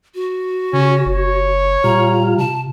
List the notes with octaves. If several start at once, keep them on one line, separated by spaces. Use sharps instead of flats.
F#4
C#3 C#4
F#1 C#5
A#2 G3 F4 A#5
C3 A5